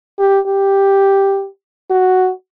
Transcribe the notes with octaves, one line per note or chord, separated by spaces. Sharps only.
G4
G4
F#4